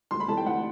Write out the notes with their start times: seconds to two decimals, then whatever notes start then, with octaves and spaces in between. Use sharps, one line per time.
0.11 D2 C6
0.20 B5
0.28 C3 E3 A3 A5
0.37 G5
0.46 D2 F#5